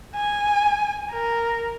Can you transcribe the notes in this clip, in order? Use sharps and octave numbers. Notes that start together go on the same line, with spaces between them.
G#5
A#4